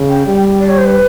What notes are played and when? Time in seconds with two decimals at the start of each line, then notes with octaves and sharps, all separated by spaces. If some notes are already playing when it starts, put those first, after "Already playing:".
Already playing: C#3
0.09 G5
0.26 G3
0.61 D5
0.69 C#5
0.78 C5
0.86 B4